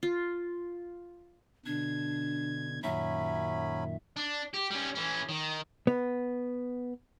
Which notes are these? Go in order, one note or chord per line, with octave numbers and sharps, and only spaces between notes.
F4
B2 D3 D4 G#6
F#2 A#2 D#3 F#3 C#4 E5 B5
D4
G4
G3 C#4
E3 C#4
D#3
B3